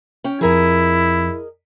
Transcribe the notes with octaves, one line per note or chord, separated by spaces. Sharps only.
C#4 G5
F2 F3 E4 G#4 A#4 D#5